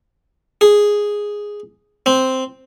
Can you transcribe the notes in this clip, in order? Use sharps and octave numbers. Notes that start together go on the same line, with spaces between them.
G#4
C4